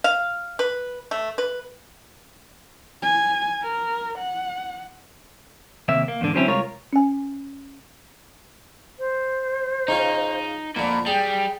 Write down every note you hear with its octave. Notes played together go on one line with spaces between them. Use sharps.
F5
B4
A3
B4
G#5
A#4
F#5
D#2 C3 A#3 E5
A#3
E2 G#2 D3
D3 F#3 C4 C#4 E4
C2 G#3 F4 A#4 C#5
C#4 G#5
C5
C#3 C#4 D#4 F4
F2 A#2 D3 B5
G3 G#4 G5